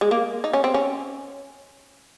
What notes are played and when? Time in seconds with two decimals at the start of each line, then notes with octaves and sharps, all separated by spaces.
0.01 G#3
0.11 A#3
0.44 D#4
0.53 C#4
0.64 C4
0.74 C#4